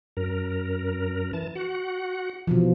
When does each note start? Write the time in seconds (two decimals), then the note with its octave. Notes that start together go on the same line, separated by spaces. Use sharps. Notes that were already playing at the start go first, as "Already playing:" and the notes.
0.17 F#2 A#4
1.33 E3 A5
1.55 F#4 F#5
2.47 B2 E3 F3